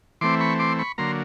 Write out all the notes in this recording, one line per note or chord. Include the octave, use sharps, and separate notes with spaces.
E3 A3 C4 C6 D6
B5 C#6
C6 D6
B5 C#6
D3 F#3 A#3 A#5 C6